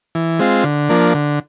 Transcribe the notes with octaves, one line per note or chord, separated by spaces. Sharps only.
E3
G#3 C4 F4
D3
F3 A#3 D4
D3